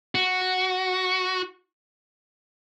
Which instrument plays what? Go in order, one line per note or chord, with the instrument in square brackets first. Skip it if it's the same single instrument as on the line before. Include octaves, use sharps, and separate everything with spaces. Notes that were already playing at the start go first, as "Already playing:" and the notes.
[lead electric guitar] F#4